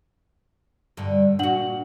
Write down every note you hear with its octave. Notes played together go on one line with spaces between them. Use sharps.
G2 D3
A#2 D4 F#4 F#5 F#7